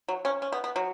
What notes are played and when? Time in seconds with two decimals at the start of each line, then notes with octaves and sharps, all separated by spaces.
0.08 F#3
0.25 C#4
0.42 C#4
0.52 B3
0.64 B3
0.76 F#3